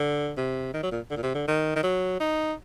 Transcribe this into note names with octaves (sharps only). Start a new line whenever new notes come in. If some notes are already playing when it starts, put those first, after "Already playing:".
Already playing: D3
C3
D#3
F#3
A#2
D3
A#2
C3
D3
D#3
D#3
F#3
D#4